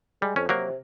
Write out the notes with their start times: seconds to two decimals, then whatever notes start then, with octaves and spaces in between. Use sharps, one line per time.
0.22 G3 G#3
0.36 F2 C#4
0.49 C3 F#3 A#3 A#4